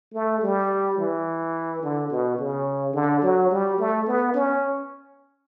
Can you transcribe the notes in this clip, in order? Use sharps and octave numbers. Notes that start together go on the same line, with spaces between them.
A3
G3
E3
D3
B2
C#3
D3
F#3
G3
A3
B3
C#4